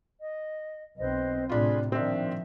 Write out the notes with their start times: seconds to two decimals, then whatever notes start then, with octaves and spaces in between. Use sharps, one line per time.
0.19 D#5
0.99 B1 C4 B4 C5 D#5
1.49 A2 C3 D4 F4 G#4 B5 C6
1.92 A#2 D#3 F3 C4 D4 E5